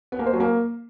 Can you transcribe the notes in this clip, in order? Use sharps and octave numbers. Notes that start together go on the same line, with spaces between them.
B3
A#3
C5
F#3
A#3